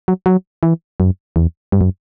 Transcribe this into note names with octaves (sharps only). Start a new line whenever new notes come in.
F#3
F#3
E3
F#2
E2
G2
F#2